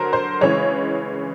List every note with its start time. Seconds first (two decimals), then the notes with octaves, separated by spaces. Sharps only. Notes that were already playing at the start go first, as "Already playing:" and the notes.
Already playing: D3 F#3 A#4 C5
0.13 C5
0.41 C#3 E3 G#3 C#5